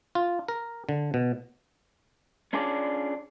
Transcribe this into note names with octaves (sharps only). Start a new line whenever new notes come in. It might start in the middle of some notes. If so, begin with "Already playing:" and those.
F4
A#4
D3
B2
C#4 D4 F4 G#4 D5